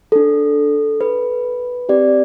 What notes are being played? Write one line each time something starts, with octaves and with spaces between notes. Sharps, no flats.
D4 A4
B4
C4 G4 D5